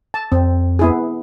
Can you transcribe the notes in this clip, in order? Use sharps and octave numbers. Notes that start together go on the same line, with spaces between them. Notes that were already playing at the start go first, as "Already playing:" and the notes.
A5
F2 C4
B3 E4 G#4